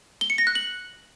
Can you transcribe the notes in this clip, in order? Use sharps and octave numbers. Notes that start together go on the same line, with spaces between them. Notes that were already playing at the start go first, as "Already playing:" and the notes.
G7
C#7
A#6
F#6
F#7